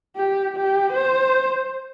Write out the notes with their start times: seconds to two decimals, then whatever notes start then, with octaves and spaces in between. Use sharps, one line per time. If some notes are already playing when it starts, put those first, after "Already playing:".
0.16 G4
0.57 G4
0.93 C5